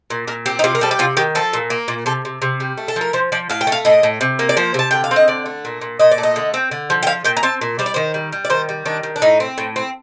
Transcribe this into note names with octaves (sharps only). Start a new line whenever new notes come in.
A#2
A#2 A#4
C4 G4
D#4
C3 F4
A#4
G3 A4
G4
C3 F4
D#3 G4
F3 A4
A#2
A#3
A#2
C3 A4
C3
C3
G3
A3
A4
F3 A#4
F3 C5
F3 D5
A2 F5
G5
A3
F5
A2 D#5
A2
C3
A#3
D5
F3 C5
C3 A5
D3 G5
F5
C4
D#5
D3 D5
A3
A#2
A#2
A#2 D#5
D5
A3
D#5
D3
C4
D3
F3
G5
F3 F5
A#2 G5
A#5
C4 A5
A#2
G3 C5
D5
D#3 C5
G3
G3
D5
D#3 C5
G3
D#3 D4
D#3
D4
A2 D#4
C4
A2
C4